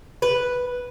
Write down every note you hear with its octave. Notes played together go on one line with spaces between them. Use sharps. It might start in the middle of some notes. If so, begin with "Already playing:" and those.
B4